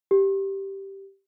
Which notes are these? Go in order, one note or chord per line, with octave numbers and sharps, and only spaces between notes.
G4